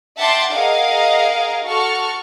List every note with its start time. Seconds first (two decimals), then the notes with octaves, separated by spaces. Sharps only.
0.17 E5 F#5 G5 A5 C6 D6
0.52 G#4 A#4 D#5 F5 F#5
1.65 F#4 A4 C#6 F6